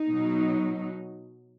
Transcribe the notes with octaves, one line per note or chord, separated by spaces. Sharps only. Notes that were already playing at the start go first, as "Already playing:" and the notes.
Already playing: D#4
B2 F#3